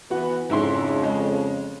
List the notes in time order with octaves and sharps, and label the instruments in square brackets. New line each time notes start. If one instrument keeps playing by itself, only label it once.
[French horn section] E3 B3 [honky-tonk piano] F#4
[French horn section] F2 C#3 [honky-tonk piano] G#2 E4 C6
[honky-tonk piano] G#3